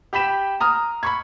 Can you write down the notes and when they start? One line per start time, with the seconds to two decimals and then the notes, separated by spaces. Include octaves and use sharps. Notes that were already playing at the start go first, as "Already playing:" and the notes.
0.13 G4 G5 B5 B6 E7
0.60 A#5 D#6 F6
1.03 B5 C#6 G#6